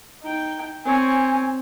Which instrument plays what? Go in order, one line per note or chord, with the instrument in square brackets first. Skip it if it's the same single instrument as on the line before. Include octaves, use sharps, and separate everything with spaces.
[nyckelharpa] D#4 G5
[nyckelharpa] C4 C#5 [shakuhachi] G#5